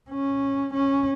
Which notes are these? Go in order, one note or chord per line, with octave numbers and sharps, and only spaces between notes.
C#4
C#4